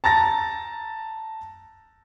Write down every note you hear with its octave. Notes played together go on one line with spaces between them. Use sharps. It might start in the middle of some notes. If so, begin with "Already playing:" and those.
A5 A#5 A6 A#6